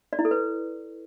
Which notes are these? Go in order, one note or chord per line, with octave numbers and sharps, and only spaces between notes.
D5
E4
A4
B4